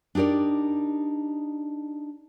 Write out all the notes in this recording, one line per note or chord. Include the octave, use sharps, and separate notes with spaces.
D4 D#4 G4 A#4 D5